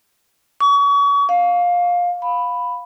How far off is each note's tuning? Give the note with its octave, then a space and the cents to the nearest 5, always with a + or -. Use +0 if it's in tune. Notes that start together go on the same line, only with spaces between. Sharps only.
C#6 +35
F5 +20
B5 +5